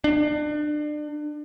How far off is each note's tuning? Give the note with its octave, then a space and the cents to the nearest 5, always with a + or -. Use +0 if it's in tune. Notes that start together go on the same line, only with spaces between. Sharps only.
D4 +30